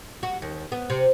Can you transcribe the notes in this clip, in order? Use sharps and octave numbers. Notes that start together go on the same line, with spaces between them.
F#4
D#2
B3
C3